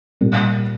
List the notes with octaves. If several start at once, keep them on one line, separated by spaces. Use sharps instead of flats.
A#2 G3 A#3